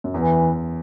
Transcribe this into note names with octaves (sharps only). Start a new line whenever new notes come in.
F#2
E2 E3